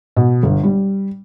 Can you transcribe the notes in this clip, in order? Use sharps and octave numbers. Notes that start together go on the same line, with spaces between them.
B2
G1
G3